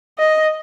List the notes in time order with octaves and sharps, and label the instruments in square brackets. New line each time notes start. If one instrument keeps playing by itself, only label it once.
[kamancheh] D#5